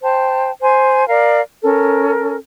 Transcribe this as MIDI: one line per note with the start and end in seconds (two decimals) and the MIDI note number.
0.03 0.51 72
0.03 0.51 79
0.03 0.51 81
0.61 1.08 72
0.61 1.08 80
1.08 1.41 70
1.08 1.41 74
1.08 1.41 77
1.63 2.37 61
1.63 2.37 69
1.63 2.37 70